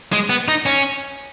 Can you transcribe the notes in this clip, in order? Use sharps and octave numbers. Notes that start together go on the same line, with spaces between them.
G#3
B3
D#4
C#4